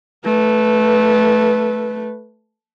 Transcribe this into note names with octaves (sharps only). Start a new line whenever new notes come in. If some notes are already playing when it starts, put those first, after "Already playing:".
A3 B4